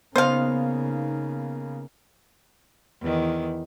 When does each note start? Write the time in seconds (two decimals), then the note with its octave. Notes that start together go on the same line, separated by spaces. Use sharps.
0.16 C#3 A#3 B3 D#4 C5 F5
3.01 E2 D#3